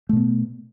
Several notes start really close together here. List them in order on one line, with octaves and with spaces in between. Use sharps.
A3 B2 B3